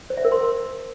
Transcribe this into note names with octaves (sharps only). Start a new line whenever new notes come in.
C5
E5
A#4
C6